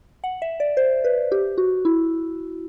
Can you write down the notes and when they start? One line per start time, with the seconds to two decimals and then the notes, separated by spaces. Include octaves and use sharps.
0.24 F#5
0.42 E5
0.60 D5
0.77 C5
1.04 B4
1.32 G4
1.58 F#4
1.85 E4